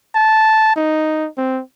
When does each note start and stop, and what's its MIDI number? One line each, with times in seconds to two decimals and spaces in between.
0.15 0.75 81
0.76 1.28 63
1.37 1.61 60